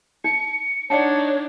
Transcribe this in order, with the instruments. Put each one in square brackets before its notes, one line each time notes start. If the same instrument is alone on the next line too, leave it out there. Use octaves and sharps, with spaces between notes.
[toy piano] D#4 [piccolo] C#7
[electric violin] D4 D#4 [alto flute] C#5 [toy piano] D5 F#5 A5